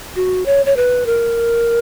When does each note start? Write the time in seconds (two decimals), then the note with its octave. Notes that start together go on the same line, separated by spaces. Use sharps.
0.16 F#4
0.46 C#5
0.66 C#5
0.76 B4
1.06 A#4